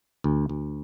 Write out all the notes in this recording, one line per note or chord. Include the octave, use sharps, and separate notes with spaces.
D2
D2